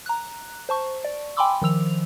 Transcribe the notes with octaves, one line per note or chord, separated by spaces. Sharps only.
A#5 F#6
C5 A5 C#6
D5
G5 G#5 B5 C6 D6 E6
D#3 F3 E6 F7